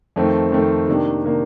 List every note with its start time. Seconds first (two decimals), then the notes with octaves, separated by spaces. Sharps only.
0.16 F2 D#3 A3 C4
0.52 F2 D#3 A3 C4
0.88 C3 D#3 A#3 D4
1.24 C3 D#3 A#3 D4